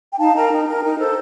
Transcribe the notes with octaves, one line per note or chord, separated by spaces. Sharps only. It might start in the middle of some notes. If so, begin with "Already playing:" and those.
G5
D#4 F5 A5
A#4 G5 A#5
D#4
A#4
D#4
A4 C5